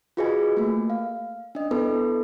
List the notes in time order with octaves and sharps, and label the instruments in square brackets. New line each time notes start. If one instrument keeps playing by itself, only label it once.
[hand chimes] F4 F#4 G#4 B4 D#5 G#5
A3 A#3
F5
D4 D#5
B3 E4 A4 B4